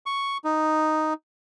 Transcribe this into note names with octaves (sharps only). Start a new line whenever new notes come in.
C#6
D#4